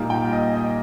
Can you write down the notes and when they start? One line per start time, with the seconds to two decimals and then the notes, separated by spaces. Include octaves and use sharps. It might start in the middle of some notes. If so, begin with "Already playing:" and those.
Already playing: A#2 G3 A#3 D#4
0.10 G5
0.33 D#5
0.56 D#5